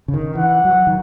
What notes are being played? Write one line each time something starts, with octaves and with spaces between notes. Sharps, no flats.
C#3
D#3
E3 F#5
F#3
D#3